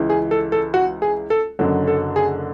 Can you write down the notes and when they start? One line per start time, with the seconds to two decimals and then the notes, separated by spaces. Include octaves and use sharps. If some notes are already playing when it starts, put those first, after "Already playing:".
Already playing: C#2 C#3 E3
0.10 G#4
0.31 A4
0.52 A4
0.74 F#4
1.02 G#4
1.30 A4
1.59 F#1 F#2 D3 F#3
1.87 A4
2.16 G#4